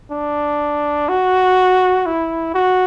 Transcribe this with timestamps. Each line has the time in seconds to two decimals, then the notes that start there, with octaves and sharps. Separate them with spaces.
0.11 D4
1.09 F#4
2.06 E4
2.54 F#4